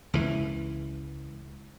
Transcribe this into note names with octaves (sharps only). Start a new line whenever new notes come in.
C#2 E3